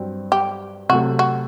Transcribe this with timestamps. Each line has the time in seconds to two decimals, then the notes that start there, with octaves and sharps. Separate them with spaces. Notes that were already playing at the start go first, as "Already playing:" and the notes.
Already playing: G2 F#3 C4
0.32 G4
0.89 C3 F#3 A3 F#4
1.19 F#4